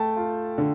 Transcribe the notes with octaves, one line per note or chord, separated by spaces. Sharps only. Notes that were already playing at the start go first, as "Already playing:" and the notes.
Already playing: A3 G5 A5
F4
D3